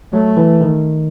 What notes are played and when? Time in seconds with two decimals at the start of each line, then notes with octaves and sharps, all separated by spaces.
0.13 F#3 A3
0.37 E3
0.61 D#3